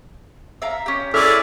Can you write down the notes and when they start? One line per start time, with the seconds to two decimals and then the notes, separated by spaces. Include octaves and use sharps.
0.62 E5 F5 A#5
0.86 C#4 G4
1.14 C#4 E4 G#4 A4 D5 E5 F6